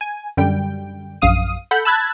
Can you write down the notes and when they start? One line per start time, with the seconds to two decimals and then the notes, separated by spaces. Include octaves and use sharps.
0.01 G#5
0.37 F#2 D3 G3 G5
1.22 A#1 F#2 F5 D#6 D#7
1.71 A4 F#5 B5 G6
1.85 A5 B5 E6 F#6 G#6 A6